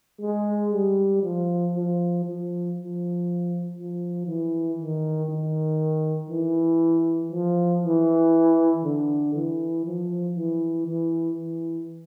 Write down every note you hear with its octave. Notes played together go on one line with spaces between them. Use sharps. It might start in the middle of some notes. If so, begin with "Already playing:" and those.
G#3
G3
F3
F3
F3
F3
F3
E3
D#3
D#3
E3
F3
E3
D3
E3
F3
E3
E3
E3